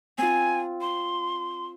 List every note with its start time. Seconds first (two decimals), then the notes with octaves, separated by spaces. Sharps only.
0.18 C4 F4 G#5
0.81 C6